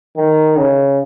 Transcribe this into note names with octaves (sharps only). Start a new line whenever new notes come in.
D#3
C#3